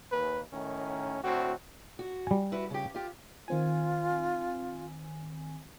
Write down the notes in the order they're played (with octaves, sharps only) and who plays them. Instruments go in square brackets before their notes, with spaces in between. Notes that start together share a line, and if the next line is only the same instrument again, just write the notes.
[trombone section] D#2 [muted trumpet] B4
[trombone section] A2 D#3 [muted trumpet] C#4
[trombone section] D2 A2 C4 [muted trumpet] F#4
[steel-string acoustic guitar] F#4
[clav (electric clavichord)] G3 G#5
[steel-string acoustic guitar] E4 F#4 B4
C#3 G4
F4 G4
[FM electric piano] D#3 C4 G#5 [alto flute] F4